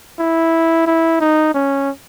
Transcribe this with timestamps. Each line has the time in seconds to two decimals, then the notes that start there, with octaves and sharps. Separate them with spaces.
0.19 E4
0.87 E4
1.21 D#4
1.54 C#4